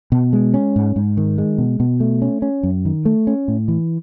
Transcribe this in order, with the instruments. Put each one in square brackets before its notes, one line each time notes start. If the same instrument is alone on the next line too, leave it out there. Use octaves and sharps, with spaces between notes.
[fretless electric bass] B2
G#3
C#4
G#2
G#2
D#3
G#3
B2
B2
A3
C#4
C#4
F#2
D#3
A3
C#4
A2
E3